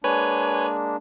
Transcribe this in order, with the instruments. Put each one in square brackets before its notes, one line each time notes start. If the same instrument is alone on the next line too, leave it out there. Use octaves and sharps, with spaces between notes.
[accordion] G#3 A#3 D4 [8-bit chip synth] B4 C#5 G#5